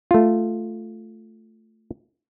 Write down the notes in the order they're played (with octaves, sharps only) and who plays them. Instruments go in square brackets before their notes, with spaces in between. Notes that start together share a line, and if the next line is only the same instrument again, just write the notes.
[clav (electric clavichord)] A3 F4